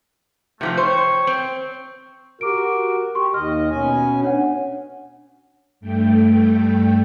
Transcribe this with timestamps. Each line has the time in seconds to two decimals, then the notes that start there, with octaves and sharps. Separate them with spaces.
0.61 C3 E3 F3 A3
0.77 C5 C#5 G5 C#6
1.27 C4
2.41 F#4 G4 A#4 D6 D7
3.15 G4 C6 C#6
3.34 D#2 D#3 D#5 F6
3.71 B2 C#4 G#5
4.22 D4 C#5 F#5
5.81 G2 A3 G5